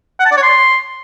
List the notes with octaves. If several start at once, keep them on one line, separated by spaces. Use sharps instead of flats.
F#5
A5
D5
C#5
C6